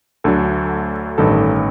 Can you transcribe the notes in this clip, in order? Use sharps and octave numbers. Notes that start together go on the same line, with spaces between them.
D2 D3 F#3 A4
A1 G2 D#3 A4